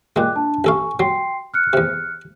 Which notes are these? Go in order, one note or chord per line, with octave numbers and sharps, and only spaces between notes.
A#2 G#3 G5 D6 F#6
D4 A5
A1 A4 F5 G#5 C#6
F#3 G5 C6 C7
F6 F#6 C#7
E2 C3